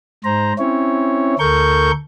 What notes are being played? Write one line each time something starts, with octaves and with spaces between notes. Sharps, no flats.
G#2 C5 A#5
C4 C#4 E4 C#5
D2 A4 A#4 C#6 G6